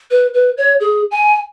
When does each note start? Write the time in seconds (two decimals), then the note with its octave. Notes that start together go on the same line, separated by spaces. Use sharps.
0.11 B4
0.34 B4
0.57 C#5
0.80 G#4
1.11 G#5